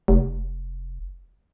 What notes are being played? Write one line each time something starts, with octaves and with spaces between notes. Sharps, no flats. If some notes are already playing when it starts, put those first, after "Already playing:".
F1